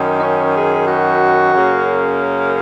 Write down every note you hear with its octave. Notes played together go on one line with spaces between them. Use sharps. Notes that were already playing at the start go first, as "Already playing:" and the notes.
Already playing: F#2 D#3
D#4
C#4
G#4
F#4
F#2 C#3 A#3